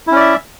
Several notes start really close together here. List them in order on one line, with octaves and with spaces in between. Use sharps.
E4 C#4 D5 E5